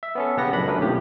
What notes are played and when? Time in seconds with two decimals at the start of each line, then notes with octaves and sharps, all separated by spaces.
0.03 E5
0.15 B3 C#4 A4
0.37 A#1 C#3 B3 G4 F#5 A#6
0.52 C#2 F#2 D4 B5
0.66 F#2 D3 F#3 C#4 D4 B4
0.79 B1 A2 C3 F3 G4